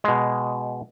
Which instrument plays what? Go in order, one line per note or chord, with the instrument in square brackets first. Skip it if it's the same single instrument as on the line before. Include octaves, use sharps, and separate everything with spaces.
[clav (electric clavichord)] B2 G#3